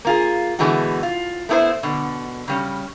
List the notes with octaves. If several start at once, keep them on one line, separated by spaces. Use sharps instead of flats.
A#3 F4 G#4
B2 D3 E3 G#3 A3 F#4
F4
A3 B3 E4 A#4 C5
B2 D3
C#3 G3 C#4